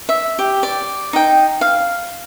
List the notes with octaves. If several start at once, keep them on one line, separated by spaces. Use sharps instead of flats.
E5
G4
D5
D#4 G5
F5